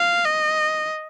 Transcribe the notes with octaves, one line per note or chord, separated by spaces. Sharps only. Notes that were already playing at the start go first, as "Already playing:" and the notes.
Already playing: F5
D#5